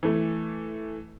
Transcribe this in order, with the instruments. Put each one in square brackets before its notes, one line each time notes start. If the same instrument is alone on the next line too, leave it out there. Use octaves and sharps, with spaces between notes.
[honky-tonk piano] E3 A3